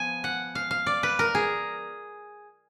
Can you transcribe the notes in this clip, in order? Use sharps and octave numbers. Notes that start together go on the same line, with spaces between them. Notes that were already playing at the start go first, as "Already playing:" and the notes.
Already playing: F3 B3 G#5
F#5
F5
F5
D5
B4
A#4
G#4